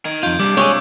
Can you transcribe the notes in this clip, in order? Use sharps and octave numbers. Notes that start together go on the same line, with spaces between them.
D#3 G#6 D7
F2 F4 G6
G2 C3 G3 D6
G#3 G4 G#4 C#5 D6 E6 F#6